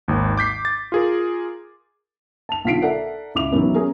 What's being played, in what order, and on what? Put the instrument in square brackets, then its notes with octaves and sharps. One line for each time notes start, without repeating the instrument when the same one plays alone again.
[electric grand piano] G#1 D#2
D6 G6 B6 C7
A6
F4 G#4 A#4
[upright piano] A5 F7
B1 D3 F4 B6 C7 D7
A4 A#4 D5 E5 F#5
C#2 E4 D6 F7
D#3 E3 F#3 B3 C#4
C#4 G#4 A#4